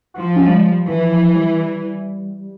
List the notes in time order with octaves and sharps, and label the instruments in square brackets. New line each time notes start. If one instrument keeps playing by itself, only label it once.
[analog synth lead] F#4
[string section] F3 [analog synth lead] F4
[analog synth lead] C#4
G3
G#3
G3
[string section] E3 [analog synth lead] F3
[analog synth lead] F3
G3